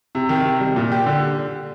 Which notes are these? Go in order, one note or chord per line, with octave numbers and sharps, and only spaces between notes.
C3
D#3
C3
G3
A#2
G4
D3